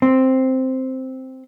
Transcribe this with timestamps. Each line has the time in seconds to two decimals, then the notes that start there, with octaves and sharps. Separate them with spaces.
0.02 C4